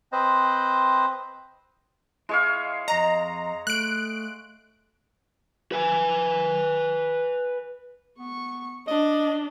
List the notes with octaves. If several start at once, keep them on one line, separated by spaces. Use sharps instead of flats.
C4 B4 C5 D#5
G#3 E4 C#5 F5
F2 D#5 A#5
A3 F#6 D7
B4 G#5
B3 C#6
D4 D#5